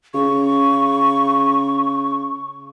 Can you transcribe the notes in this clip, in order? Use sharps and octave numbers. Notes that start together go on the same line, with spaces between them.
C#3 C#6